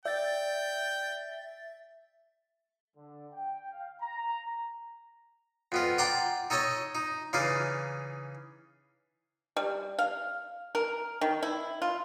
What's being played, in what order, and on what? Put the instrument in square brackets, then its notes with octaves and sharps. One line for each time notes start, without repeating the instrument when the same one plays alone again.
[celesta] D5 [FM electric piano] E5 A6 [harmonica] G5
[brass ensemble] D3
G5
F5
A#5
[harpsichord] F2 B3 F4
D5 F#5 G5 A#5 C6 D6
D#4 A4 C#5 D#5
D#4
C#3 E3 D#4 D5 F5
[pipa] G3
F5
A#4
D#3
E4
F4